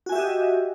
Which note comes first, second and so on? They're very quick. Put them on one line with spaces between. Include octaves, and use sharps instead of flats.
F#4 G#5 E5 G4 D#5